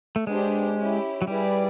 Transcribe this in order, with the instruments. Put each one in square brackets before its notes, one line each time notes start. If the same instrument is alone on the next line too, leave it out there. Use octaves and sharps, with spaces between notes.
[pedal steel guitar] A3
[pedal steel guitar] G#3 [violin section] B3 D4 G4 C5
[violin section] C#4 E4 G4
[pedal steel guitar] F#3
[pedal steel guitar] G3 [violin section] E4 G#4 B4 D5